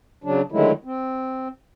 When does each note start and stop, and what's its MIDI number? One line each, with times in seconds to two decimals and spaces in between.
0.24 0.41 49
0.24 0.41 54
0.24 0.41 62
0.52 0.72 50
0.52 0.72 51
0.52 0.72 54
0.52 0.72 56
0.52 0.72 57
0.52 0.72 64
0.85 1.48 60